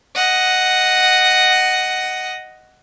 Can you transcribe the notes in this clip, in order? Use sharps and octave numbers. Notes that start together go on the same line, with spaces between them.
D#5 F#5